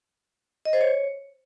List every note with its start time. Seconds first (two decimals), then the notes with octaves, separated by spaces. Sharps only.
0.65 D#5
0.73 C5
0.81 C#5